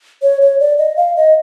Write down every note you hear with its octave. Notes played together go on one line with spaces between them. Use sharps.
C#5
C#5
D5
D#5
F5
D#5